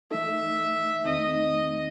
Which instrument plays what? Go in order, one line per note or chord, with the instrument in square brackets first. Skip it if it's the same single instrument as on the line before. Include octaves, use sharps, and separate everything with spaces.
[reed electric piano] E3 A3 D#4 A4 [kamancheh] E5
[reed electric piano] E2 D#3 A3 C4 D#4 [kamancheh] D#5